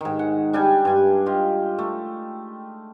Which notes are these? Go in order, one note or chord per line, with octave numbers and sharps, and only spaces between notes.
G#2 D#3
F#5
G3 D4 G5 G#5
G2 G#5 C6
F4 G4 D#5
A3